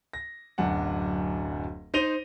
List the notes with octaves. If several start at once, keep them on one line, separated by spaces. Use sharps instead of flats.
A#6
D1 F#2 D4 F#5
D#4 C5 A#6 D#7 F7 G7